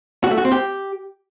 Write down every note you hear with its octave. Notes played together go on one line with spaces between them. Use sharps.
F#4
A3
F#4
C4
G4